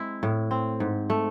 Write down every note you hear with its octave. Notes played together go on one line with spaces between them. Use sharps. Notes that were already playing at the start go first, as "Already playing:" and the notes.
Already playing: G#3 C4 E4
A2
C4
G#2
A3